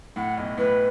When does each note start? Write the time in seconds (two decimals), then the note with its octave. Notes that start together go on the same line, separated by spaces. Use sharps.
0.16 A2 F#5
0.37 B1
0.57 A2 B4